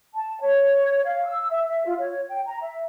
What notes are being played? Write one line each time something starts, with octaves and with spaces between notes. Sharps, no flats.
A5
C#5
F5
E6
E5
E5
F4
C#5
G5
A#5
E5